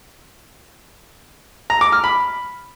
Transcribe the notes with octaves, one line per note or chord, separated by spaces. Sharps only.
A#5
D6
F6
B5